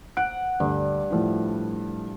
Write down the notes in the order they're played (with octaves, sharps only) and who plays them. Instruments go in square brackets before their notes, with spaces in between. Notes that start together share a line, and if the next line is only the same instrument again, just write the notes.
[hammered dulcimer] F#5 [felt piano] D7
[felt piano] D2 [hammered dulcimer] G2
[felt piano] A2 F3 E4